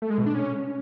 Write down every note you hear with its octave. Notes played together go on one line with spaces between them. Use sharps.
A3
G#3
B2
D4
C#4